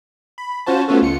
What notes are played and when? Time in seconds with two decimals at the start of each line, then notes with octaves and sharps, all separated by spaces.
0.38 B5
0.66 C#4 F4 F#4 C5 A5
0.88 A3 B3 C#4 F4 F#4 A4
1.02 C#2 F4 C#7